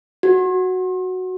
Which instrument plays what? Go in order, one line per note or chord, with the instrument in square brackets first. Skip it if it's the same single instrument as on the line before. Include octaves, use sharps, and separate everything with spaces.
[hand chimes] F#4